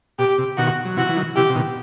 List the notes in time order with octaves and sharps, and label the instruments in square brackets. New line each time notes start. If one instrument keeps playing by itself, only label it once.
[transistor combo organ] B2 [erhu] G4
[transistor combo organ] C3
[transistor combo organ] B2 D#3 [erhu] F#4
[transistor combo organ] F#3
[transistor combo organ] C3 E3 [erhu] F#4
[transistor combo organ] E3
D#3 F#3
[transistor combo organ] C3 E3 [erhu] G4
[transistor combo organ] C3
B2 D#3